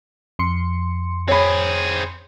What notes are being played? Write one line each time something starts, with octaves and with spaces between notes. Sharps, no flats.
F2 C6 C#7
C4 G#4 C#5 B5